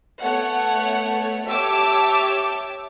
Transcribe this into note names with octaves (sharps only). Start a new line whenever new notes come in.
A3 B3 C#5 F#5
G4 C#5 E5 A5 D6 E6